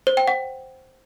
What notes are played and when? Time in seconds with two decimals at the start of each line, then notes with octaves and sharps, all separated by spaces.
0.07 C5
0.17 G5
0.28 F#5